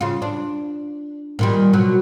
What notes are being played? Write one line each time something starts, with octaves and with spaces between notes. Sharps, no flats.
C#3 F4
D4
A#2 D#3 G3
B2 F#3